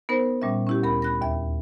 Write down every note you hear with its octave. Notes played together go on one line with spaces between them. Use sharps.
B3 D#4 A#4 C5
A#2 G3 C#4 E5
C#4 E4 G4
D2 A#4 B5
B5 F#6 A#6
D#2 E5